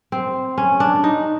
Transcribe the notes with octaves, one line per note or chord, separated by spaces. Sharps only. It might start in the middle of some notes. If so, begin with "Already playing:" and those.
C4
C#4
D4
D#4